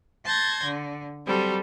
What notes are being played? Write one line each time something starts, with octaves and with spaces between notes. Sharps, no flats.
A5 C6 G6 G#6 A#6
D3
F#3 G3 C4 A4